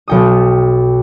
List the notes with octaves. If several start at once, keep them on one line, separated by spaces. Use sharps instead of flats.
B1 G5 D#6